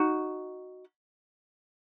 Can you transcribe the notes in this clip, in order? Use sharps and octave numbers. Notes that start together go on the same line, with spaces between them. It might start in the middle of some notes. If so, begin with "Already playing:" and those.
Already playing: D#4 F#4